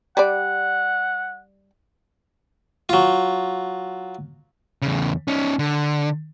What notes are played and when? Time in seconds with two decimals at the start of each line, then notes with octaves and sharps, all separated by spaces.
0.17 G3 D5 F#5
2.89 F#3 F4
4.82 E2 C#3
5.28 C#4 D#4
5.59 D3